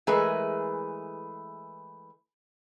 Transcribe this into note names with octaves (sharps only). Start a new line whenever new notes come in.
E3 G#3 A3 G#4 A#4 B4